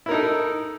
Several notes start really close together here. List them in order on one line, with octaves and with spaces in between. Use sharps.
E4 A#4 D#4 A4